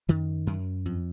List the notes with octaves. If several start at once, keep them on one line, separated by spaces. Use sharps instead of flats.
F#2 D#3
F#2
F2